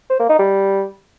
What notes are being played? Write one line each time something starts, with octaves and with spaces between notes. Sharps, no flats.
C5
A#3
D#4
G3